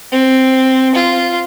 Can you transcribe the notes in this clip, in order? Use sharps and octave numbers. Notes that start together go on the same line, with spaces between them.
C4
F4